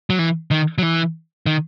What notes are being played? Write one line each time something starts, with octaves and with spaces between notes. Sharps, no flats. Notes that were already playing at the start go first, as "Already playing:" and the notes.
F#3
E3
D#3
F#3
E3
D#3